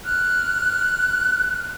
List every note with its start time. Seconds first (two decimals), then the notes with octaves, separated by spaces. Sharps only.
0.04 F6 F#6